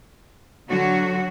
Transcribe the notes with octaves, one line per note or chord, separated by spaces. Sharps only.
D3 F#3 F#4